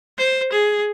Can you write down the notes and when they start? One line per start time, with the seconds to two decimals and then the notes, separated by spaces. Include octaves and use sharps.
0.18 C5
0.52 G#4